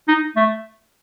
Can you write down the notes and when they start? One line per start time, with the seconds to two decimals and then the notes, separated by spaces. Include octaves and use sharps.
0.08 D#4
0.37 A3